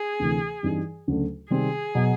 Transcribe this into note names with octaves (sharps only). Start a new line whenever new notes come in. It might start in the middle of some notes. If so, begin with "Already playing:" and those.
Already playing: G#4
D2 C3 E3 A3
G2 E3 G3 C4 D#4
D2 C#3 F#3 A3 D4
C3 D#3 G3 C4 G#4
B2 F#3